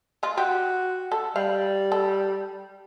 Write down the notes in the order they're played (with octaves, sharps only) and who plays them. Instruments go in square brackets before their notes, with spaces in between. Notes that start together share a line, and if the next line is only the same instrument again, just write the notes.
[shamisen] G#3 F4
[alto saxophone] F#4 [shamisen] G4
[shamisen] A4
[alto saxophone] G3 [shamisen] F5
[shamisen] A4